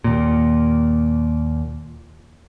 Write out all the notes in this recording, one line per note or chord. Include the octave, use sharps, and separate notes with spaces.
D#2 A#2